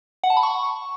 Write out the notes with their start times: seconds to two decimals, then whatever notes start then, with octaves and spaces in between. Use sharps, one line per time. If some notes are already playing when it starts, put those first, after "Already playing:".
0.24 F#5
0.30 A5
0.37 B5
0.43 C#6